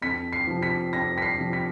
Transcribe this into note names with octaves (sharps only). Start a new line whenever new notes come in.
F2 B6
C7
C3 F3
B6
F2 A#6
B6
C7
C3 F3
B6